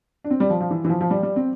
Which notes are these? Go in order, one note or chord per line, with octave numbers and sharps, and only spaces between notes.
D4
C4
G3
F3
F3
E3
E3
F3
F3
G3
G3
C4